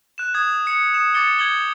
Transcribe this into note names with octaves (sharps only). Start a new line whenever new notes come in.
F#6 E7
D#6 G#6
D#6 C#7
D#6 E7
D6 A6 C#7 G7
D#6 G6 G#6 F#7 G7